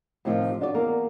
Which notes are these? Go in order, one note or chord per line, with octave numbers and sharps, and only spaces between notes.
A2 C3 D#3 F3
D4 F#4 C#5 D5
E2 A#3 A#4